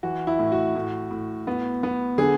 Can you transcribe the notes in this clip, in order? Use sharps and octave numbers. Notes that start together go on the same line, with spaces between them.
E3 F#4
E4
A2
F#4
A2
A2
B3
B3
D3 G#4